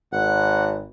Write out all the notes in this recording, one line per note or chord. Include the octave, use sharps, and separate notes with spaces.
G#1 F#5